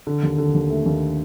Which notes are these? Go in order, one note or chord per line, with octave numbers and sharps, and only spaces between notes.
D3
D#2
D3
D#2
A3
D#2